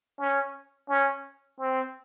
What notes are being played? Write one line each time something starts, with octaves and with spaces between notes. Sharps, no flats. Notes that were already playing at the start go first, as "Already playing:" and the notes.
C#4
C#4
C4